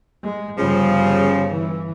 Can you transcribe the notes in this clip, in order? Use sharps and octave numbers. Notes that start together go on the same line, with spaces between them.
G#3
G1 C#3 F3 G3
E3